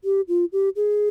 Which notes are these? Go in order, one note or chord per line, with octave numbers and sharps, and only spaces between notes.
G4
F4
G4
G#4